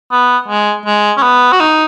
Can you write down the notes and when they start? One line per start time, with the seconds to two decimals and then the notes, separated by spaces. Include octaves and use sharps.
0.12 B3
0.48 G#3
0.86 G#3
1.17 C#4
1.23 B3
1.52 F#4
1.60 D#4